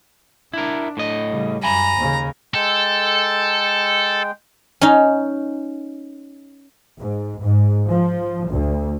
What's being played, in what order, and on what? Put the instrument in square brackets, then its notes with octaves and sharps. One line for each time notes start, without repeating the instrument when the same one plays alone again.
[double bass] D4 [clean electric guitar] E4 A#4
[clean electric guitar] A2 D#5
[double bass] C#3 G3
[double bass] F#2 [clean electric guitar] G#5 B5 [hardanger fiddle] A#5
[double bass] D#2 C#3
[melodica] G#3 G5 [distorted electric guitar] A4
[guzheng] C#4 D#4
[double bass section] G#2
G#2
F3
D2